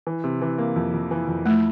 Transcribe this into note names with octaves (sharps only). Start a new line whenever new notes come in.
E3
C3
E3
A#3
F2
F2
E3
F2
A3 E4